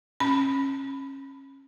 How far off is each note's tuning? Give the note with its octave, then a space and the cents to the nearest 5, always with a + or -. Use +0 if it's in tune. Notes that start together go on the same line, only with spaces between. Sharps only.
C#4 -25 B5 +0